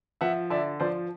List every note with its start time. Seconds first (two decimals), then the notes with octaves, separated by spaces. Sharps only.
0.21 F3 E5 F#5
0.50 D3 D5 E5
0.80 F3 C5 D5